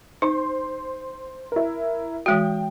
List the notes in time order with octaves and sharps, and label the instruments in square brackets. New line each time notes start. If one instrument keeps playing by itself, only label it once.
[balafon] D#4 [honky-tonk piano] C5 C6
[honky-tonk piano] E4 A#4
[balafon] E3 G#3 F#4 [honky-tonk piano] G5